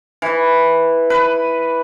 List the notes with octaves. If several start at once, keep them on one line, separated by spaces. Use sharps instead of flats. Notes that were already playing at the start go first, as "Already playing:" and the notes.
E3
B4